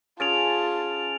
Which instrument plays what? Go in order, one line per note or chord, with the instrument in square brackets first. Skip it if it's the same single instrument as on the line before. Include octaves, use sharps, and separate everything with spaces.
[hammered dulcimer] C#4 G#4 [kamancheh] F4 A5 [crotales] A6 D7 F7